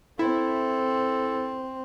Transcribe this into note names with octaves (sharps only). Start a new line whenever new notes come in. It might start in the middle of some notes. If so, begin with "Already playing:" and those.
C4 E4 A4